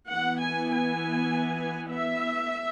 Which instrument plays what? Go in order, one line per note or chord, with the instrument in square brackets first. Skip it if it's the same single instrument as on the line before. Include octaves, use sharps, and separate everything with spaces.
[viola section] E3 B3 F#5
G#5
G#5
E5